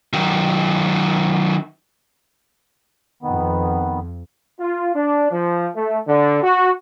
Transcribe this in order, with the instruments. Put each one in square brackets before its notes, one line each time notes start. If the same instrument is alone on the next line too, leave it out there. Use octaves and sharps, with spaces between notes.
[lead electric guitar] D#3 F#3
[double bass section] F2 [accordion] D#3 B3
[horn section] F4
D4
F3
A3
D3
F#4